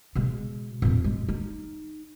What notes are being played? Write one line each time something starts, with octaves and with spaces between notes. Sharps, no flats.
B2 G#3
F2 A#2
G#3
D#4